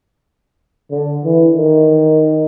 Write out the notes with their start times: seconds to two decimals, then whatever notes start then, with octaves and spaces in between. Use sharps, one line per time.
0.91 D3
1.24 E3
1.57 D#3